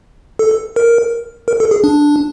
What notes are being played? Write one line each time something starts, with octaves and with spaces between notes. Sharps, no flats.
A4
A#4
A#4
A4
G#4
D4